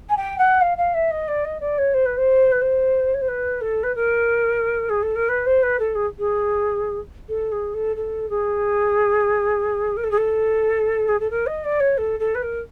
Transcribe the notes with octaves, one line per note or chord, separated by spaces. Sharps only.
G#5
G5
F#5
F5
F5
E5
D#5
D5
D#5
D5
C#5
C5
B4
C5
B4
C5
C#5
C5
B4
A4
B4
A#4
G#4
A4
A#4
B4
C5
B4
A4
G#4
G#4
A4
G#4
A4
A4
G#4
A#4
A4
G#4
A4
G#4
A4
A#4
D#5
D5
C#5
A4
A4
B4
A#4